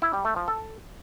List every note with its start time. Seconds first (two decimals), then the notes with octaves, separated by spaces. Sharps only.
0.02 E4
0.13 G3
0.25 A3
0.36 F3
0.48 A4